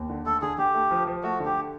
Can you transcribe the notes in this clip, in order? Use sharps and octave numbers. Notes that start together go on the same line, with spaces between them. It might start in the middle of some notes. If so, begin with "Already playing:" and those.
Already playing: D#2
D3
A3 A4
D3 G#4
D3 G4
A3
F3
F3
A3 F#4
D3
G4